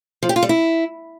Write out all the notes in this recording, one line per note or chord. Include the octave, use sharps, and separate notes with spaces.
F3
G4
F4
G3
E4